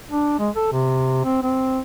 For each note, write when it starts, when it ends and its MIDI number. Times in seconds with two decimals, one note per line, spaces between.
0.10 0.35 62
0.39 0.49 56
0.55 0.67 69
0.72 1.24 48
1.24 1.40 60
1.43 1.80 60